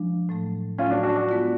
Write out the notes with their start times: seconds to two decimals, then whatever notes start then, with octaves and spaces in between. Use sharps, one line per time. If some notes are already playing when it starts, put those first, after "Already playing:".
Already playing: F3 G#3 D4
0.29 A2 F#3 A3
0.78 A2 F#3 A3 C#4 F4
0.90 D4 F#4
1.03 D4 F#4
1.16 D4 F#4
1.29 G#3 B3 F4